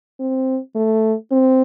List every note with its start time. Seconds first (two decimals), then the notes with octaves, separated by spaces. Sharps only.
0.20 C4
0.76 A3
1.32 C4